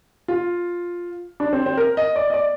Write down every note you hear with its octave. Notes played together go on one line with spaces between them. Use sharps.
F4
D4
C4
C4
A#4
D#5
D5
D#5
D5